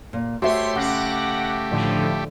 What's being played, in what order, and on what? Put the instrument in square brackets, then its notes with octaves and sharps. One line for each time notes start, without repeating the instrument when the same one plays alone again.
[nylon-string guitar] A#2
[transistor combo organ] A3 G4 [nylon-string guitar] F#4 C5 E5 [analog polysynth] C#5 C6
[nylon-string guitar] C#3 [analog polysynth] F#5 D6 A#6
[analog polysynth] A2 D3 F3